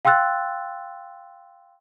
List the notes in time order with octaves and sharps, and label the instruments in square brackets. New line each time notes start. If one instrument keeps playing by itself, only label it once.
[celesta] F5 G5 C6 E6 F#6 A6